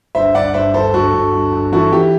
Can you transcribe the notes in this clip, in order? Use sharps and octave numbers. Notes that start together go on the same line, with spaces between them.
G1 C5 E5
G1 D5 F#5
G2 C5 E5
G1 A4 C5
G1 F#4 A4
G1
G1
G1
E3 F#4 A4
E3 G4